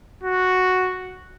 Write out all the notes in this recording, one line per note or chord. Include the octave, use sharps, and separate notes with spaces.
F#4